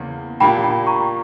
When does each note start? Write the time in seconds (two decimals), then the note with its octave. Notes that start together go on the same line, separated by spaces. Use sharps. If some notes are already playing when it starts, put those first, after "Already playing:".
Already playing: E2 C#3 A#3
0.40 A#2 A#3 D4 G4 G5 B5
0.63 G5 B5
0.87 A#5 C#6